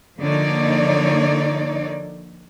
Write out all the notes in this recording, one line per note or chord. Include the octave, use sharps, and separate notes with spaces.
D3 F3 A#3 D#4 C#5 D5